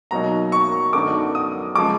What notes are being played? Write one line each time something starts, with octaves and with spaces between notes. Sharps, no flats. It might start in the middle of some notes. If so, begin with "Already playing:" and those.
B2 F#3 A#3 D#4 A#5
C#6
F#2 D3 F#3 B3 D#4 D6
D#6
C#3 F3 G#3 D6